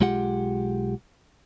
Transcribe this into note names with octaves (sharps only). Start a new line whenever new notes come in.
B1 G#3 F4 G4 F#5